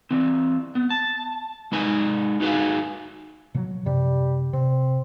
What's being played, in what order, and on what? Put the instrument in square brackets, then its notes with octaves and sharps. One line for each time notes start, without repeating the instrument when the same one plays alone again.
[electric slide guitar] E3 C4
B3
A5
G#3 D#4 B4 G#5
D#4 F#4 G#4 B4 F5 G#5
[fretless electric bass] B2 F3 F#3
[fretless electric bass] F#2 C3 [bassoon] G3
[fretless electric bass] C3 [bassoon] C4